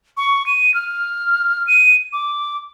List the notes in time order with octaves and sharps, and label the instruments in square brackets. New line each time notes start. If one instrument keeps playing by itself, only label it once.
[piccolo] C#6
D#7
F6
D#7
D6